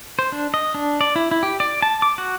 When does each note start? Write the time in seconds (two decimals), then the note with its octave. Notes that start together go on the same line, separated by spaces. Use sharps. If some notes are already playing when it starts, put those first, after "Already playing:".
0.19 C5
0.32 D4
0.54 D#5
0.75 D4
1.01 D5
1.16 E4
1.31 E4
1.43 G4
1.60 D5
1.82 A5
2.02 D6
2.18 F#4